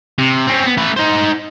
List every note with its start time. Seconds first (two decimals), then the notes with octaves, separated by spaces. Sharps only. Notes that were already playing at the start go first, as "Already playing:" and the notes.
0.18 C3
0.47 C4 C#4
0.65 B3
0.77 A3 B4
0.97 D#4 C5